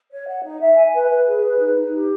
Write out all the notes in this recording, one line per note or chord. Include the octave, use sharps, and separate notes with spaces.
C#5
F#5
D#4
E5
G#5
B4
B4
G#4
B4
D#4
D#4
G4